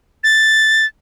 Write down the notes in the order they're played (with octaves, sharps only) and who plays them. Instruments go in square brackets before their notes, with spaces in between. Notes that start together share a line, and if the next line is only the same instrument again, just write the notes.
[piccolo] A6